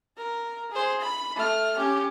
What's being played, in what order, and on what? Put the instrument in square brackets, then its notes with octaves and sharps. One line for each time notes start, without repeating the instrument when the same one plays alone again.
[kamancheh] A#4
G#4 C5
B5
A3 F6
C#4 G4